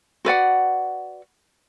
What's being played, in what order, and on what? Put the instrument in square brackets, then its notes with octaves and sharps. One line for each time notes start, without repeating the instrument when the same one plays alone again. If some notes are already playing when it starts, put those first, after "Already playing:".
[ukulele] F#4 B4 D5 F#5